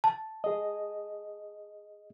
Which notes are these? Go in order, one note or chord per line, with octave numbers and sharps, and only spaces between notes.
A5
G#4 D#5